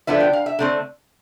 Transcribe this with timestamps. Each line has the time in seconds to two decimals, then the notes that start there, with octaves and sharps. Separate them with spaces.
0.07 D3 F3 B3 D4 E5
0.20 G5
0.33 F5
0.46 E5
0.59 D3 A3 C4